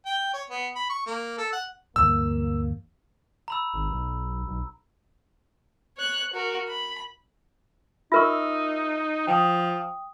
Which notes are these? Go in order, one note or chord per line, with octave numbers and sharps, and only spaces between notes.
G5
C#5
B3
B5
C#6
A#3
A4
F#5
D2 G2 E3 A#3 E6
A#5 B5 E6
G#1
B1
B1
C#5 F#6
F#4 A#4
B5
D#4 F4 A#4 E5 C#6 E6 F6
F3 G5 D#6